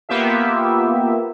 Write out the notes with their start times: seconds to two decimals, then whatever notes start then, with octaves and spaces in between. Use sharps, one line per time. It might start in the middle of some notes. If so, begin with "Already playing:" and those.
0.09 A#3 B3 F4 G4 E5